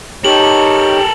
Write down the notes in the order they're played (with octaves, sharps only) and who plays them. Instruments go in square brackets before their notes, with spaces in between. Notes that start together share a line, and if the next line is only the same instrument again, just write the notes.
[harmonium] D#4 C#5 [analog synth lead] G4 [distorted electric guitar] A4 A#4 [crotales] F#7